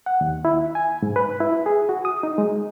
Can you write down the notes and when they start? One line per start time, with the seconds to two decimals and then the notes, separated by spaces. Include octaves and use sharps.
0.06 F#5
0.21 D#2
0.45 E4
0.75 G#5
1.02 G#2
1.16 B4
1.40 E4
1.66 G#4
1.89 F#4
2.05 D#6
2.23 D#4
2.38 G#3